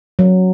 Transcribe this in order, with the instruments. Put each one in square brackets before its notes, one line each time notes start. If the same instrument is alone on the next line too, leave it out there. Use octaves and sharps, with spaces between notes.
[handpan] F#3